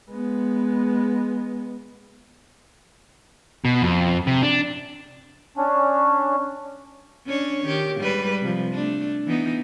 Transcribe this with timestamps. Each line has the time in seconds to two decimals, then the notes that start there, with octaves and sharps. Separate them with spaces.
0.10 G#3 B3
3.65 B2
3.82 F2
4.27 C3
4.43 D4
5.57 C#4 D4
7.26 C#4 D4 C#5
7.66 D#3 G4
7.99 G#2 G3 B4
8.42 C3 F3
8.73 A3 D4
9.26 E3 B3 D#4